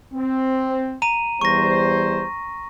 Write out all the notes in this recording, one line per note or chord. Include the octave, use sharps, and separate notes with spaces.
C4
A#5 D#7
E2 G3 C5 C#6 A#6